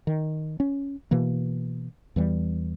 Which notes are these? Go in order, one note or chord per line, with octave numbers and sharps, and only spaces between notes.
D#3
C#4
B2 E3 A#3
E2 E3 F#3 G3